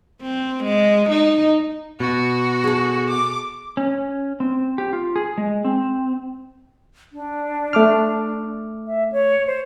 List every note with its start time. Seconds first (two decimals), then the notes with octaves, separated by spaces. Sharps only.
0.23 C4
0.64 G#3
1.10 D#4
2.00 B2 F#4
2.64 G#4 A4
3.09 D6
3.77 C#4
4.40 C4
4.78 G4
4.93 F4
5.16 G#4
5.38 G#3
5.65 C4
7.12 D4
7.73 A3 D6 F6
8.87 E5
9.12 C#5
9.47 C5